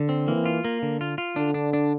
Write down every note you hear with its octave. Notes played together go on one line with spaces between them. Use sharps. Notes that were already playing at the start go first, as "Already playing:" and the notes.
Already playing: D3
C4
E3 A#3
F4
A#3
D3
F4
F4
D3 D4
D4
D4